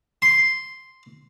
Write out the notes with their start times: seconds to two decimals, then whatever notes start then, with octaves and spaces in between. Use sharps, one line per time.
0.22 C6